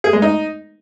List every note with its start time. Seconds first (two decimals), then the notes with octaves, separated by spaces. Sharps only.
0.04 G#4
0.13 G#3
0.22 D#4